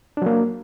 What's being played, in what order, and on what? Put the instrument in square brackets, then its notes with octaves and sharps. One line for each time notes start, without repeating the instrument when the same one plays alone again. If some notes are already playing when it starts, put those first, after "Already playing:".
[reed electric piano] D4
F#3
A#3